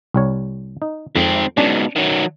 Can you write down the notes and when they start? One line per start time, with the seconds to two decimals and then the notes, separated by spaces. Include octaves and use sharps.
0.14 C2 G3 C#5
0.82 D#4
1.15 F2 G#2 C4
1.57 G#2 B2 C#4 D4
1.96 D#3 F#3